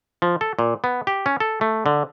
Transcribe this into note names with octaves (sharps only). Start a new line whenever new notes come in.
F3
A4
A#2
B3
G4
C#4
A4
A3
D3